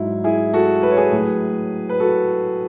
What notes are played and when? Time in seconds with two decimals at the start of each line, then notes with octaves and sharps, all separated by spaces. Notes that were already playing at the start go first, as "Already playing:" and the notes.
Already playing: G#2 F#3 E4
0.24 E4 G#4
0.53 F#4 A4
0.83 B4
0.91 C#5
0.97 G#4 B4
1.12 A2 F#3
1.89 B4
2.00 F#4 A4